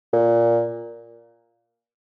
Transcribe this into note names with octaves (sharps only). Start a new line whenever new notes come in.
A#2